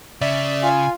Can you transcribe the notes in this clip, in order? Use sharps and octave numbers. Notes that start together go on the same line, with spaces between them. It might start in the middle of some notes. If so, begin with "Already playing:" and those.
C#3 D5 E5
F4 G#5